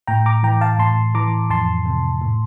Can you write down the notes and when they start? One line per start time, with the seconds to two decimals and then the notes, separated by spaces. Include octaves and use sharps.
0.07 A2 G5 A#5
0.26 A#5 D6
0.43 E3 G5 A#5
0.61 F5 A5
0.79 A2 A5 C6
1.14 E3 A#5 D6
1.50 F2 A5 C6
1.86 C3
2.21 A2